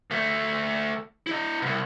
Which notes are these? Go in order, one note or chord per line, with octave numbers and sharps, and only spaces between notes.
D2 A3
E4 D#5
C2 B2